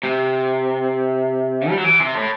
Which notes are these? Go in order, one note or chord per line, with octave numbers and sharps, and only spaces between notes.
C3
G3
F#3
E3
C3
A2